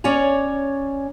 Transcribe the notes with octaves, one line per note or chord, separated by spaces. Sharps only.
C#4 C#5 D5 G#5 A#5